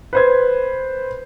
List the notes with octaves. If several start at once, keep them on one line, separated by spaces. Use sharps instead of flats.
B4 C5 G#6